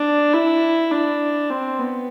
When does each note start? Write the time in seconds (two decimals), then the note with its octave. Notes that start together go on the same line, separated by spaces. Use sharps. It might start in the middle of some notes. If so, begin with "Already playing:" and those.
Already playing: D4
0.33 E4
0.91 D4
1.50 C4
1.79 B3